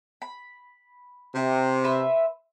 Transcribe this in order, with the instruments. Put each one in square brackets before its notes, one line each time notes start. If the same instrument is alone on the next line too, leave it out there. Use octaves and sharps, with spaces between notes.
[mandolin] B5
[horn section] C3
[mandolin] B4 E5 C6